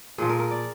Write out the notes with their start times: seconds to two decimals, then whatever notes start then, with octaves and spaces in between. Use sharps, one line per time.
0.18 A#2 F3 G#4
0.29 A#4
0.39 A#4
0.51 D5